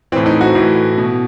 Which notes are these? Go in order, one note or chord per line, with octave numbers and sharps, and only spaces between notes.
A2 E3 C4
D#4
F#4
A2 E3
B2